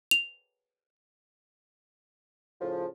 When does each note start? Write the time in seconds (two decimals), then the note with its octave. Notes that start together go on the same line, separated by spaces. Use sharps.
0.11 F7
2.61 A2 C#3 F3